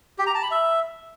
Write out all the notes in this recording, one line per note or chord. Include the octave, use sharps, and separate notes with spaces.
G4
A#5
A5
B5
E5